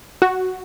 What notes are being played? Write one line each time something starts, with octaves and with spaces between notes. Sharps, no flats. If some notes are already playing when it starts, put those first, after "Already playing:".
F#4